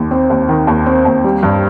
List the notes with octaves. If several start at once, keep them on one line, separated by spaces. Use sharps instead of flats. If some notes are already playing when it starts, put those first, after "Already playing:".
Already playing: D#2 D#3
C4
D#2
D#3
D#2
C4
D#2
G3
G2